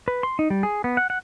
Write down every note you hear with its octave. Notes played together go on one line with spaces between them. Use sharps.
B4
C6
D#4
G3
G#4
B3
F#5
F#5